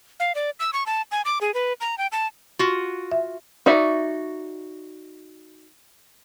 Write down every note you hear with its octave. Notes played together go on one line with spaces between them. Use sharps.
F5
D5
E6
C#6
A5
G#5
D6
G#4
B4
A#5
G5
A5
F4 F#4
E5
D#4 F#4 D5 E5